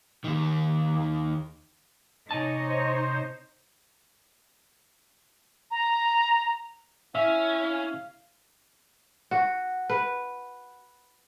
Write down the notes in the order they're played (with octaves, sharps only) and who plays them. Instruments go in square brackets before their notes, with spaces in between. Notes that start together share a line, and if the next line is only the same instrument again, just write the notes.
[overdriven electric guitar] D#2 D#3
[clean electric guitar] C3 G#5 A5 [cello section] D#4 C#5 D#5
[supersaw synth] C5
[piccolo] A#5
[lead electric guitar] C#4 [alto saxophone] E4 [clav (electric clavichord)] E5 [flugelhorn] F5
[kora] F#4
B4